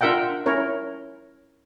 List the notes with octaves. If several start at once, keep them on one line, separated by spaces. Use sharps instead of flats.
D4 F4 A#4 E5 F#5 G5
C#4 E4 A#4 C#5